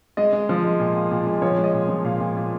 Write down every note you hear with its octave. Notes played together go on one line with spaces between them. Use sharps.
G#3 D#5
G#3
F3
G#3
A#2
A#2
A#2
G#3
F3 C#5
G#3
D#5
A#2
F3
A#2 F5
A#2
A#2